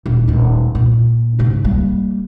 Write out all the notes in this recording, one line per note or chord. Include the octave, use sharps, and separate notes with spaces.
D#1
D#1 A2
A#2
G#2 C#3
G3 A#3